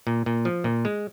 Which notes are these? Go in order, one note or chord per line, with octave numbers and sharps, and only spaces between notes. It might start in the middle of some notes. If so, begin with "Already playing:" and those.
A#2
A#2
F3
A#2
G#3